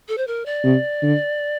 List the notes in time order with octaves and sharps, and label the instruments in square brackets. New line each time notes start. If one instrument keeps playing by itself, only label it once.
[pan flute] A4
C5
A#4
D5
[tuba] C3
D3